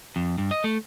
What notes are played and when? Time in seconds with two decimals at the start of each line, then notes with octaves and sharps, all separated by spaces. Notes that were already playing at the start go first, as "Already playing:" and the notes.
0.16 F2
0.38 G2
0.51 D#5
0.64 A3